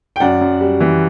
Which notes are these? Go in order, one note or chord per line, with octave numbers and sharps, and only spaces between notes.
G5
F#2 D5 F#5
F#2
G3
E3